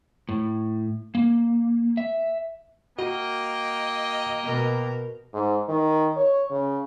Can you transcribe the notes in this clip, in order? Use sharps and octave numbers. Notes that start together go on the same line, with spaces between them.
A2
A#3
E5
A#3 F#4 D#5 G5
B2 A#4
G#2
D#3
C#5
C#3